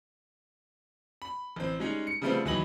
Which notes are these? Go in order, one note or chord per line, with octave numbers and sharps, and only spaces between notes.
B5
A1 C4
G3 G#3 C#4 D#4
C#7
C#3 F3 G3 A3 B3 C4
D#2 E3 F#3 D#5 B5 F#7